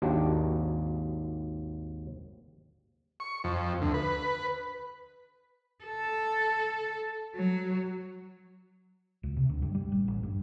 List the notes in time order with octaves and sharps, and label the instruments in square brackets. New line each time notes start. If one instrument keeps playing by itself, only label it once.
[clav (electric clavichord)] G#1 D#2 D4 F#4 G4
[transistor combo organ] C#6
F2
D2
B4
[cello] A4
F#3
[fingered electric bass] C#2
C3
D2
G2
G3
A1
A1
G2